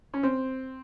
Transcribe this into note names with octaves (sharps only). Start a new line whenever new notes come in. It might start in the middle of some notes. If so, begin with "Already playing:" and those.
C#4
C4